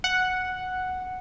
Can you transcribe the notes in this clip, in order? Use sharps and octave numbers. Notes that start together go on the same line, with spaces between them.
F#5